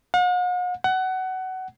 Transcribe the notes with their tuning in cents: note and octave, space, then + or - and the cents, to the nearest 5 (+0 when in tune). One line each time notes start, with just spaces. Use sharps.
F#5 -45
F#5 +20